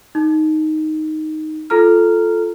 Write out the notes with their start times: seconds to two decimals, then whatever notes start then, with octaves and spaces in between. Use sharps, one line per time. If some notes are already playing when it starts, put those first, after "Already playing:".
0.15 D#4
1.70 F4 A4 A#5 F6